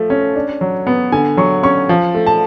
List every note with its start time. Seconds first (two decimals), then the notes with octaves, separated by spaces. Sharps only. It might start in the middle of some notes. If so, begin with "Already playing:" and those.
Already playing: F3 A3
0.10 C#4
0.36 D4
0.61 F#3
0.87 B3
1.12 D3 G#5
1.37 F#3 C#6
1.63 C#4 C#6
1.89 F3
2.15 A3
2.27 A5